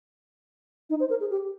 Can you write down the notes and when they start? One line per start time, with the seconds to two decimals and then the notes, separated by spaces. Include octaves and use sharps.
0.90 D#4
1.00 C5
1.10 A#4
1.20 G#4
1.30 G4